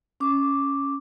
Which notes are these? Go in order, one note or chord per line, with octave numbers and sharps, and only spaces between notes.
C#4 D6